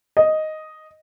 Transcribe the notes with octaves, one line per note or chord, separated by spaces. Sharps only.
D#5